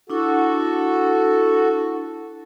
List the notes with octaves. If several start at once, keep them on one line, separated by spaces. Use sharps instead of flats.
D4 E4 F#4 A4 C#6